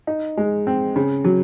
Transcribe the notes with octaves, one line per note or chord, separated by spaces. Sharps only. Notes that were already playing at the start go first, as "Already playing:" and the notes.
D#4
G#3
C4
C#3
F#3